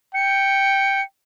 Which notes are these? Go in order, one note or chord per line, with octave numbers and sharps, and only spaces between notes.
G5 C#7